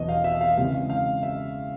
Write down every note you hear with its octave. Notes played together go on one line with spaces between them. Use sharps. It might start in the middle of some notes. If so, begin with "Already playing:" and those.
Already playing: E2 B2 F#3 B3 D#5
F5
E5
F5
C#3 E3 G#3 C4 F5
F5
E5